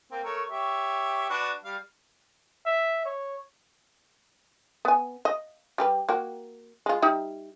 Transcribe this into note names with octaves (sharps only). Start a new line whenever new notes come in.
A#3 C4
A3 A#4 C#5
G4 C#5 E5
D4 F#4 B4
G3 F5
E5
C#5
B3 G#5
D#5
G3 G4 B4
A#3 F#4 G5
G#3 F4
G3 D#4 E5